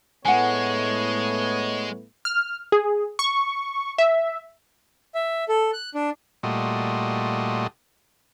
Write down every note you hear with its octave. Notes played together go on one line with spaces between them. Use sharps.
A2 G#3 A3 B3 C#5 F#5 G#5
F6
G#4
C#6
E5
E5
A4
F#6
D4
A#2 G3 A3 F#4 D#5 C6